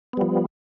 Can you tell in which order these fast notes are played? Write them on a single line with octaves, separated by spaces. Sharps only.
B3 G3 F3